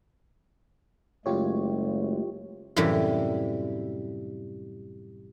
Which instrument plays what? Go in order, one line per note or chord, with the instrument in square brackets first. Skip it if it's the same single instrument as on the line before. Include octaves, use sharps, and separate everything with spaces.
[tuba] F#1 [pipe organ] G#3 A3 [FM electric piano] F4 G4 C#5
[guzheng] F#2 A2 C3 E3 G3